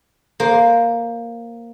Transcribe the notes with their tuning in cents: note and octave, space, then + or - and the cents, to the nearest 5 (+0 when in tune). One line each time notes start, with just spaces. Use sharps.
A#3 +0 C5 +20